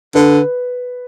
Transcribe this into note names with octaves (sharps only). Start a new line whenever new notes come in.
D3 B4